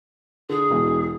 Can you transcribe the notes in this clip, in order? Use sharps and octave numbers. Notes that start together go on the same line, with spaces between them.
D3 G#4
E1 B2 E3